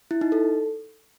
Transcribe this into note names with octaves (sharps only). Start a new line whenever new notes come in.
E4
D#4
A4